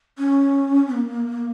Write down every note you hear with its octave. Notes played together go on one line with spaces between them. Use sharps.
C#4
A#3